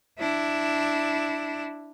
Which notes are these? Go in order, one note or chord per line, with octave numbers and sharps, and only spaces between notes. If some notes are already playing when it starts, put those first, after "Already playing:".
D4 E4